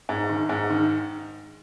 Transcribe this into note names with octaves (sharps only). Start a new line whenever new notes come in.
G#2
D#3
G#2
D#3